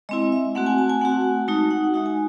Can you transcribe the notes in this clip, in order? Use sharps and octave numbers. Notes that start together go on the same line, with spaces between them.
G#3 C4 E4 D#5
E5
A3 C4 F#4 F#5
G#5
A5
G#5
A3 C4 F#4 F#5
G#5
F#5
G#3 D#4 F#4 A5
F#5
G#3 D#4 F#4 E5
G#5